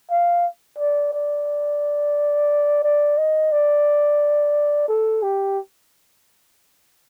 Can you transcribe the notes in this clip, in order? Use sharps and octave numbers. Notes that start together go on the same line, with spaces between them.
F5
D5
D5
D5
D#5
D5
A4
G4